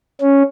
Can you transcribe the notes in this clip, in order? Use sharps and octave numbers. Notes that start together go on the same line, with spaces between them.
C#4